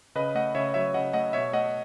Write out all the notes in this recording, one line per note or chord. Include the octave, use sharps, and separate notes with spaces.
C#3 B4 D#5
A3 D#5 F#5
C#3 C#5 E5
F#3 C#5 E5
C#3 D#5 F#5
A3 D#5 F#5
B2 C#5 E5
A3 D#5 F#5